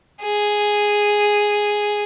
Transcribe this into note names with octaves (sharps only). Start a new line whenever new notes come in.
G#4